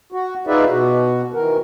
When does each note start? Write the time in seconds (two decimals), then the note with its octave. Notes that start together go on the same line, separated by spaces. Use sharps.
0.12 F#4
0.47 D#4 F4 G#4 B4 D5 E5
0.69 B2 F#4
1.34 D#3 E3 A#4